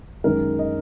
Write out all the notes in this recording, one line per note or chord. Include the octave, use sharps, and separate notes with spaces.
F#2 D#3 G#3 A#4
D#5